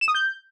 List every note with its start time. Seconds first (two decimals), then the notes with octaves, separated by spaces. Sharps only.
0.01 E7
0.08 D#6
0.15 G6